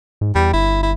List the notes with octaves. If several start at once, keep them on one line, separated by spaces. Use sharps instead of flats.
G#2
E2 G3
G1 E4
E4